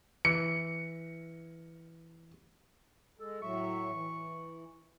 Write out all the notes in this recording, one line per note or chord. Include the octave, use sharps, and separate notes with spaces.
E3 C#7
G#3 A4
A2 F#3 E5 C#6
E3